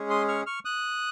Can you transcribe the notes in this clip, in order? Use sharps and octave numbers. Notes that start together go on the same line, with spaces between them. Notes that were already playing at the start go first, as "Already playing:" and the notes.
Already playing: G#3 C#4 G#4
C6 D#6
C#6 F6
C#6 F6
D#6 F#6